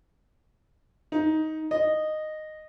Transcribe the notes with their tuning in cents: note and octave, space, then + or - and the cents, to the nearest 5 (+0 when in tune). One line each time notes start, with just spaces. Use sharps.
D#4 +10
D#5 -10